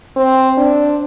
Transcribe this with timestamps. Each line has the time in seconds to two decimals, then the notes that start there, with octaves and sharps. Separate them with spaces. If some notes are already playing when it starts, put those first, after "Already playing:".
0.16 C4
0.57 D4